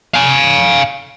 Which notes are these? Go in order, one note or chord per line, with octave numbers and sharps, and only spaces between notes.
F5 G#5